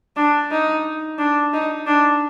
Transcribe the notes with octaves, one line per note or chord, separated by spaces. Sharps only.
D4
D#4
D4
D#4
D4